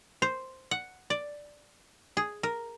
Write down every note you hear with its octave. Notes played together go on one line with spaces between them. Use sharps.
C5
F#5
D5
G#4
A#4